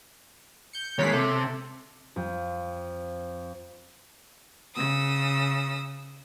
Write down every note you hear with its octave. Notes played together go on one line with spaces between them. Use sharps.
G6 C#7
D#2 G#3 C#5 B6 C7
C3 A4
F2
C#3 D#6 E6